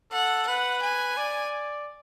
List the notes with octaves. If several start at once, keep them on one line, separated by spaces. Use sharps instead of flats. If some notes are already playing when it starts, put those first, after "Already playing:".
A4 F#5
B4 F#5
G#5
D5